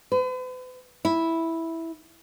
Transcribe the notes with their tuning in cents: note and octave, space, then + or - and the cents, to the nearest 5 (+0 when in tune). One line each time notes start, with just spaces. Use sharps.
B4 +45
E4 -5